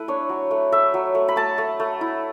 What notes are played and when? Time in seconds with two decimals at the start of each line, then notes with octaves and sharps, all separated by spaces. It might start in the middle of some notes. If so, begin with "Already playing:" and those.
Already playing: A3 E4 B4
0.08 D4 C#5
0.29 F#3
0.51 A3
0.72 A3 E5
0.94 F#3
1.15 A3
1.28 B5
1.36 A3 A5
1.58 A3
1.80 A3
2.01 E4